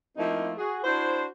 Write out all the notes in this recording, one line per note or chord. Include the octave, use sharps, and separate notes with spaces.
F3 A3 A#3 C4 D#4 E4
F#4 G#4
D4 E4 F#4 C5